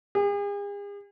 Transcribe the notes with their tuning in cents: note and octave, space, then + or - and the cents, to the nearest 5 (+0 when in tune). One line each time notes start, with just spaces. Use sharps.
G#4 -45